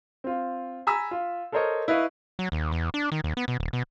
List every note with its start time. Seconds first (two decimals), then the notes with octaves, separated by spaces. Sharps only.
0.24 C4 F4
0.87 G#5 A#5 B5 E6 B6
1.11 F4
1.52 A4 A#4 C5 C#5 D#5
1.88 E4 B4 D#5 F5 C#6
2.39 F#3
2.52 D#2
2.72 E2
2.94 D4
3.12 D#3
3.24 D#2
3.37 B3
3.48 B2
3.60 D#1
3.73 B2